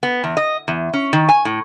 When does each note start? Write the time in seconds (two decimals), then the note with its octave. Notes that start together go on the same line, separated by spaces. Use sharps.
0.03 B3
0.24 E2
0.37 D#5
0.68 E2
0.94 C#4
1.13 D#3
1.29 G#5
1.45 A2